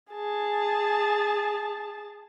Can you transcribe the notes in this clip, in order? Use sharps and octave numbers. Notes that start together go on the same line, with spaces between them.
G#4 A5